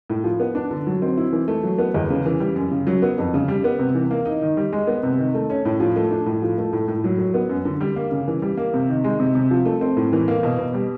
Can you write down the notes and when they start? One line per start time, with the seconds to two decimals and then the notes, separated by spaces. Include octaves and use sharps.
0.10 A2
0.24 F3
0.40 B3
0.55 D4
0.71 D3
0.87 F#3
1.02 C4
1.17 E4
1.33 E3
1.48 A3
1.63 F#3
1.79 B3
1.95 E2
2.10 C#3
2.26 E3
2.40 G3
2.56 F#2
2.71 C#3
2.87 F#3
3.02 B3
3.18 F2
3.34 C#3
3.48 G3
3.64 B3
3.79 C3
3.95 E3
4.11 A#3
4.25 D#4
4.42 D#3
4.57 G3
4.73 G#3
4.87 B3
5.03 C3
5.19 D#3
5.35 A3
5.50 C#4
5.65 A2
5.80 F3
5.96 A3
6.11 D4
6.26 A2
6.42 F3
6.58 A3
6.73 A2
6.88 A2
7.04 F#3
7.19 F#3
7.34 B3
7.49 F#2
7.65 D3
7.81 G3
7.96 A#3
8.12 C#3
8.28 E3
8.42 G3
8.57 A#3
8.74 C3
8.89 D#3
9.04 G#3
9.20 C3
9.35 C3
9.51 F3
9.66 A3
9.81 C4
9.97 A2
10.13 E3
10.28 A#3
10.43 B2
10.59 B2
10.74 G3